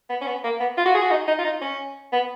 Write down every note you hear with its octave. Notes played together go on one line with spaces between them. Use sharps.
B3
C#4
B3
A#3
B3
F4
F#4
G#4
F#4
D#4
D#4
F4
D#4
C#4
B3